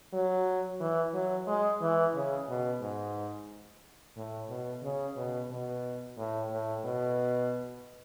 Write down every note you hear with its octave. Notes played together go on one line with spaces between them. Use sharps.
F#3
E3
F#3
G#3
E3
C#3
B2
G#2
A2
B2
C#3
B2
B2
A2
A2
B2